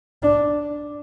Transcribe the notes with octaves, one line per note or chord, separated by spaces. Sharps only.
D4